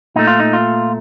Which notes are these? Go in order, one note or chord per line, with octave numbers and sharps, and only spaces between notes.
A#2 A3 D#4
F4
D#4
F4